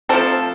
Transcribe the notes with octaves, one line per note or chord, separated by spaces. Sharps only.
F3 A3 C4 A4